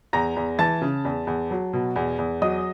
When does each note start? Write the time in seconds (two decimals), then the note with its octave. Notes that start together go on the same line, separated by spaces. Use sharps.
0.13 E2 A#5 A#6
0.36 E2
0.59 E3 A5 A6
0.82 C#3
1.05 E2
1.27 E2
1.51 F#3
1.73 B2
1.96 E2
2.19 E2
2.42 F#3 D#5 D#6